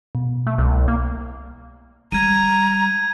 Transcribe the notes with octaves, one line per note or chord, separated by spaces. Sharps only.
B2
A3
C2
A#3
G3 A#5 G#6 D#7